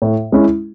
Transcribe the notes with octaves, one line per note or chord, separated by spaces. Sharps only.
A2
G#3 C#4 E4